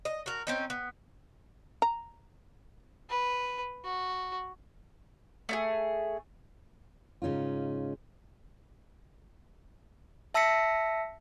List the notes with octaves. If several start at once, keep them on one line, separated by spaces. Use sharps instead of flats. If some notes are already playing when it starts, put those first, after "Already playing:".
D#5
F#4 A#4
C4 C#4 D#4
B3
A#5
B4
F#4
A3 D4 G#4
G#2 C#3 C#4 D#4 F4
E5 A5 E6 A#6 B6 C#7